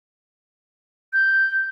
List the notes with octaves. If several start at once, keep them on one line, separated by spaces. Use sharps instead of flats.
G6